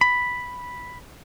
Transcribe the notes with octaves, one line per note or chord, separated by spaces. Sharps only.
B5